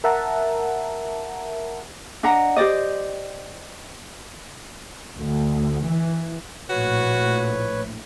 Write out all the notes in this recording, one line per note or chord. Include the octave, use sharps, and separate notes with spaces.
A#4 E5 F#5 A5 A#5
D4 D#5 F#5 A#5
G4 C5 D5 D#5
D2
E3
A#1 A2 F#4 B4 C#5